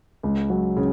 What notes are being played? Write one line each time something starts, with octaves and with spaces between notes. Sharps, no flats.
C#2
F#3
C#3